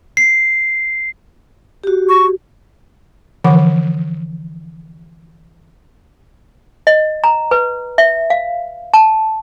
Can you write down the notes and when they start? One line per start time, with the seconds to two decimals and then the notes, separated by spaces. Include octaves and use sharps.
0.17 C7
1.84 F#4 G4
2.09 C#6
3.44 D3 E3 F3 F#5
6.87 D#5
7.24 A#5
7.51 B4
7.98 E5
8.30 F5
8.94 A5